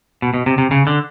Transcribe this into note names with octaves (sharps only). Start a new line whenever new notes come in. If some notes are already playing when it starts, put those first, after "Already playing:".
B2
B2
C3
C3
C#3
D3